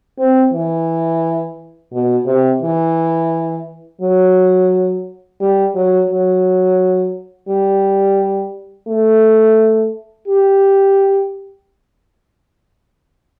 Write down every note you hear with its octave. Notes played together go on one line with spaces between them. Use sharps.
C4
E3
B2
C3
E3
F#3
G3
F#3
F#3
G3
A3
G4